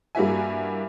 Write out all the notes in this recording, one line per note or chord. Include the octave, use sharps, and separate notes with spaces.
G2 A#3 E4 F#4 E5 G#5